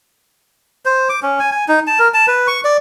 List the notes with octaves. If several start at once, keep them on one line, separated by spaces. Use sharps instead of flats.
C5
D6
C#4
G#5
G#5
D#4
A5
A#4
A5
B4
C#6
D5